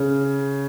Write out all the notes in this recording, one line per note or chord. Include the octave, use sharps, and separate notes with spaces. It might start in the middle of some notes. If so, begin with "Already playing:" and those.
Already playing: C#3